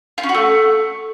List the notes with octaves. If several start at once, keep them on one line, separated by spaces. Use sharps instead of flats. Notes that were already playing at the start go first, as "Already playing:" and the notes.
F4
C#4
F#4
A3